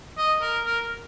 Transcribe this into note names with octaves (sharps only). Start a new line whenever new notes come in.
D#5
A#4
A#4